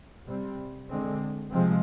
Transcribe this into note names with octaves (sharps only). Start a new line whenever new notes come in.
C3 G3 C4
D3 G#3 C4
C3 F3 G#3 C4